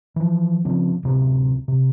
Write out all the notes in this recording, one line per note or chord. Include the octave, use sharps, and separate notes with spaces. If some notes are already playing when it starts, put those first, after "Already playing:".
E3 F3
C#3 F3 C4
D1 C3 C4
C3